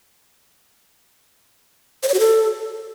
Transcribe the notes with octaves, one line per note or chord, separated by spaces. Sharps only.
C5
C#5
F#4
A4